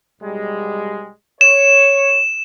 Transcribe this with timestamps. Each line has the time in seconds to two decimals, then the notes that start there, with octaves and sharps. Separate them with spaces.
0.21 B1 G3 G#3
1.41 C#5 E7